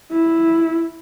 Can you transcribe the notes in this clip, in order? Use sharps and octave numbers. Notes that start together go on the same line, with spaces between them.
E4